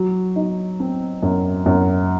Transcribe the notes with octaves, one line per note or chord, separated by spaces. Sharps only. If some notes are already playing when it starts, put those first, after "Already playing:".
Already playing: F#3
D#4
C4
F#2
F#2